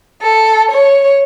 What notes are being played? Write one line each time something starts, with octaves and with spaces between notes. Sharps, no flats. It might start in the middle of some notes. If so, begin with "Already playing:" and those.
A4
C#5